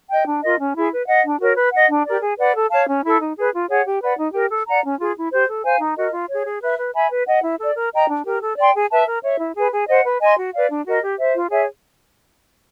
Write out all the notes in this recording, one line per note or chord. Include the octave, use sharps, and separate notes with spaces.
D#5 G5
D4
F4 A#4 D#5
C#4
E4 G#4
B4
D#5 F#5
D4
F#4 A#4 C#5
B4
D#5 F#5
D4
G4 A#4 D5
G#4
B4 D5 F#5
A4
C#5 F5 A5
C#4
E4 A4
D#4
G#4 B4
F4
G#4 C#5 F#5
G4
B4 D5 F#5
D#4
G4 A#4
A4
D5 F#5 A#5
C#4
F4 G#4
E4
G4 C5
A4
C5 F5 G#5
D#4
F#4 A#4 D#5
F4
G#4 C#5
G#4
B4 E5
B4
E5 G#5 B5
B4
D#5 F#5
E4
A4 D5
A#4
D#5 G5 A#5
D4
G4 A#4
A4
D5 G5 C6
G#4
B4 E5 A5
A#4
C#5 E5
E4
G#4 B4
G#4
C5 D#5 F#5
B4
D#5 G#5 C6
F#4
B4 D5 F5
D4
F#4 A#4 D#5
G4
C5 E5
F4
G#4 C#5 E5